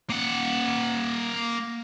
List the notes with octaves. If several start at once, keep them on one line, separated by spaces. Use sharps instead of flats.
A#3 F#5